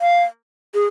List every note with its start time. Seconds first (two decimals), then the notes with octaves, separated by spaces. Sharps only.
0.01 F5
0.74 G#4